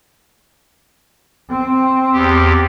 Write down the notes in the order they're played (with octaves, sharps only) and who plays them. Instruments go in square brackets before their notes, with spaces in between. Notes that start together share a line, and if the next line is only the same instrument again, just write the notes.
[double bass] C4
[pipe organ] E2 G4